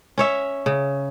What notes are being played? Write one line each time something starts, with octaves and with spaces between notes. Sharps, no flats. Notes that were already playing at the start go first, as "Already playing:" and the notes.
C#4 C#5 E5
C#3